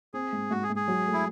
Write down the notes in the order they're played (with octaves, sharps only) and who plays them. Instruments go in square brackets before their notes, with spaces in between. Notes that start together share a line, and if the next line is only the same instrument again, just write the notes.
[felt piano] C4 [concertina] G#4
[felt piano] G#2
[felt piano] G#2 [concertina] F#4
[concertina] G#4
[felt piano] G#2
[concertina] G#4
[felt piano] F#3
A3
[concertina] E4